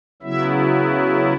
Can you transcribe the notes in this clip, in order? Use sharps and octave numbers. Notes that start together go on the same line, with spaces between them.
C#3 F#3 B3 E4 E5